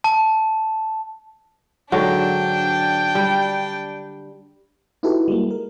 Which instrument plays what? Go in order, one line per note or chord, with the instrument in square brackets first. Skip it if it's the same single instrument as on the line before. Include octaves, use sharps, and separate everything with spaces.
[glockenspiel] A5
[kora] G#2 D3 F#3 [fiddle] D4 G5
[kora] G3
[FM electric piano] D#4 E4 F#4 G4 A4 B4
G3 G#3 A#3
A#4